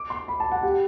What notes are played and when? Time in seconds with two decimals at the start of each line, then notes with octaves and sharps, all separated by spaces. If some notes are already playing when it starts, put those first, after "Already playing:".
Already playing: D6
0.10 C6
0.28 B5
0.40 A5
0.52 F#5
0.63 G4